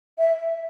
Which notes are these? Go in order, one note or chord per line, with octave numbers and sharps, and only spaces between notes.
E5